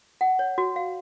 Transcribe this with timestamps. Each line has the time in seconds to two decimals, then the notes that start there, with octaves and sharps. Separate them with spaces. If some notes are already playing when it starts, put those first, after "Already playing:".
0.21 F#5
0.39 C#5
0.58 F#4
0.76 F5